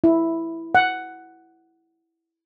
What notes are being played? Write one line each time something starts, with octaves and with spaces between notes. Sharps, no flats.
E4
F#5